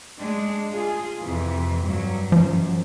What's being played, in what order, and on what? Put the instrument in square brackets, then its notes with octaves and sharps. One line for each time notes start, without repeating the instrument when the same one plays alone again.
[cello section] G#3 D4
F4 G#4
F2 C3 E3
G2 F#3
[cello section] F#2 [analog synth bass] F3